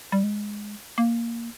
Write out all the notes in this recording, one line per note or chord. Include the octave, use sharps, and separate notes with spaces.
G3
G#3
A#3